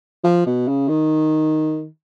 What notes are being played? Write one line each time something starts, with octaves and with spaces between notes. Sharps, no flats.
F3
B2
C#3
D#3